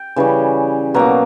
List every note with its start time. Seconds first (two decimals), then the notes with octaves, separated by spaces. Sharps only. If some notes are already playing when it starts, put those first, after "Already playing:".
Already playing: G5
0.16 C#3 E3 G3 C#4
0.94 B2 F#3 A#3 A#5